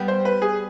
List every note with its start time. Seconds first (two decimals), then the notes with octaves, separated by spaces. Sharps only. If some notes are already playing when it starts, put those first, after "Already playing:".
Already playing: G3 B3
0.08 C5
0.25 B4
0.42 G#4